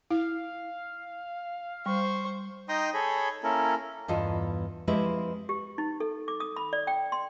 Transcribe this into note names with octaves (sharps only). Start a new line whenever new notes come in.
E4 F5
G3 C5 C#6
D#4 D#5 G5 A#5 C6 D#6
G#4 A4 C#5 B5
A#3 C#4 E4 A4 A#4
E2 G2 E3 F4 A4 D#5
F3 G#3 C4 E4 G4 B4
G4
D#4
A4
D6
D#6
B5
D5
G5
C6